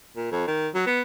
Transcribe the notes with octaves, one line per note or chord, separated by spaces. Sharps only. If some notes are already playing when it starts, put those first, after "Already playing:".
A#2
F2
D#3
F#3
B3